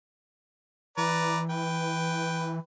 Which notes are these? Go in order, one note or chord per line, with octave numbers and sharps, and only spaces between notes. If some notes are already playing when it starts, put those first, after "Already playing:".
E3 B4 D5 A#5
B4 G5